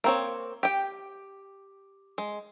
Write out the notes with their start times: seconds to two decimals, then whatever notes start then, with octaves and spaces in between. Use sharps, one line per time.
0.04 A#3 C4 C#5
0.63 G4 G5
2.18 G#3